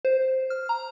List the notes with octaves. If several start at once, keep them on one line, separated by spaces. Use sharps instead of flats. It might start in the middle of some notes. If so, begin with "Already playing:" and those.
C5
F6
A#5